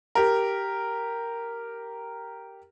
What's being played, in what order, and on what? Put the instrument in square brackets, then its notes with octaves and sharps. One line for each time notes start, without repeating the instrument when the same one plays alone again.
[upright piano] G4 A#4